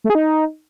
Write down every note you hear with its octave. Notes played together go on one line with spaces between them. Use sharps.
A3
G#4
D#4